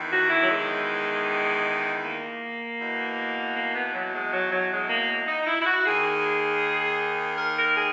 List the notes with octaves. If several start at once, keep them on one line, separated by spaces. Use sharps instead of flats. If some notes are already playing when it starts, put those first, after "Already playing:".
Already playing: E2 D#3
F#4
E4
F#3
G#3
A#3
E2 B2
A#3
B3
F#3
G#3
F#3
F#3
G#3
A#3
D#4
E4
E4
F#4
D#2 D#3 G#4
A#4
A#4
G#4